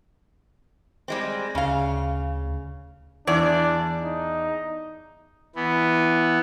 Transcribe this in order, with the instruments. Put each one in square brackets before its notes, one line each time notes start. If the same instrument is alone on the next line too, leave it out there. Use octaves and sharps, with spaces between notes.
[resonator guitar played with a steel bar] G3 G#3 C4
[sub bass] D2 [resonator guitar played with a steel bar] C#3 F5
[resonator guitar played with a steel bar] E2 D5 [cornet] D4
[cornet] D#4
[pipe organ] E3 B3